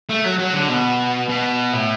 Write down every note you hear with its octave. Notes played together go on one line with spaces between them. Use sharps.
A3
F#3
F#3
D3
B2
B2
A2